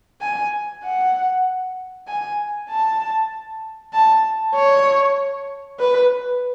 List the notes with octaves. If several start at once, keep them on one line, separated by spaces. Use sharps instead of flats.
G#5
F#5
G#5
A5
A5
C#5
B4